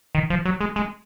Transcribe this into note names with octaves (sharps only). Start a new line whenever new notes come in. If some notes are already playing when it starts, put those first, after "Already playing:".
D#3
F3
F#3
G#3
G#3